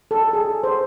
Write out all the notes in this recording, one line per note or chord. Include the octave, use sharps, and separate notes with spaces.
A4
G#4
C5